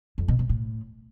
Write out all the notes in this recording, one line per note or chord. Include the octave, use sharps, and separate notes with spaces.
F2
B2
B2
A2